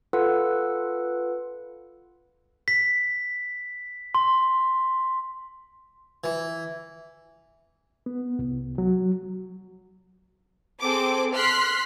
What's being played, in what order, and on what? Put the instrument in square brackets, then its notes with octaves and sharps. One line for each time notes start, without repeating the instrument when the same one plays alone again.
[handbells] F4 A4 B4 F#5
[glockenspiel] B6
C6
[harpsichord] E3
[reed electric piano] B3
C2
F#3
[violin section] C4 G#4 A4 D6
C6 F6 F#6 B6 C7